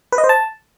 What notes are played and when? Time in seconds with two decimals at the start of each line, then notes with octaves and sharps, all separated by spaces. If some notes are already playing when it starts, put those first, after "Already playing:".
0.12 B4
0.18 D#5
0.24 C5
0.29 A5